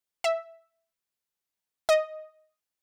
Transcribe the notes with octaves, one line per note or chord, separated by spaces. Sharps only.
E5
D#5